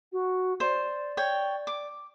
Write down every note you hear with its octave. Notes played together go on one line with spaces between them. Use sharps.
F#4
C5 D5
C#5 G5
D6